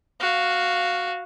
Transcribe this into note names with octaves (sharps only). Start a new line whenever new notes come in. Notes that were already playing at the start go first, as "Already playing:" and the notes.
F#4 F5